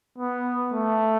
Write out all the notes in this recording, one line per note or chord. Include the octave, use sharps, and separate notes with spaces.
B3
A3